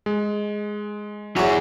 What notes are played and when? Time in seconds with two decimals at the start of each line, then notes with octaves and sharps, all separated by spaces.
0.06 G#3
1.37 E2 F#3 G#4 D5